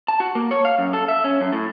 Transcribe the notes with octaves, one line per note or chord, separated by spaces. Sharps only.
A5
F#4
A#3
C#5
F5
F#2
A4
E5
C#4
F#2
A2